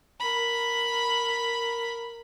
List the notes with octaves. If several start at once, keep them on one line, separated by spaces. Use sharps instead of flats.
A#4 B5